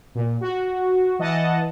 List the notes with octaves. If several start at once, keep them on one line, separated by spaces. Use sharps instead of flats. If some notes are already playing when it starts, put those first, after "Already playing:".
A#2
F#4
E3 D#5 F#5 A5